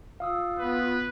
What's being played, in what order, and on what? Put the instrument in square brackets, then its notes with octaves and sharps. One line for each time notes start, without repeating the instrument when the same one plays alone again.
[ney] F4 [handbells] F5 D#6 E6
[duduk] B3 [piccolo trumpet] B4